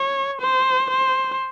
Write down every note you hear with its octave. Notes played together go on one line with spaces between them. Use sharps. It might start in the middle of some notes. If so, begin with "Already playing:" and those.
Already playing: C#5
C5
C5